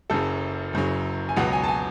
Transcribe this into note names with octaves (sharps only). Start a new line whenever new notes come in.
F#1 F#2 C#3 F#3 A4
F#1 F#2 C#3 F#3
G#5
C#2 B2 F#3 B3 F#5
G#5
A5
G#5